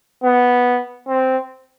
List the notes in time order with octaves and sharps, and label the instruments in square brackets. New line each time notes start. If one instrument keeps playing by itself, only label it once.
[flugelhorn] B3
C4